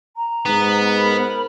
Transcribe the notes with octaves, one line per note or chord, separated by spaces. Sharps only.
A#5
G#2 B3
A#4 C5 B5